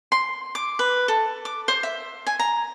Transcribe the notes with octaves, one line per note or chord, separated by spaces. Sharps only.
C6
D6
B4
A4
D6
C5
E5
G#5
A#5